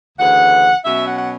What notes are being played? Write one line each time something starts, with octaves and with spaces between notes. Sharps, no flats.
D2 C#3 E3 F#5
B2 F#3 C#4 E5
F#5
F#5